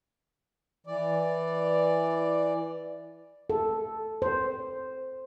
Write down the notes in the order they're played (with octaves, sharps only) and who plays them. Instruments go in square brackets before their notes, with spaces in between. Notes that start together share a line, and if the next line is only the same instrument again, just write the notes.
[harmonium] E3 D5
[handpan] A4
C5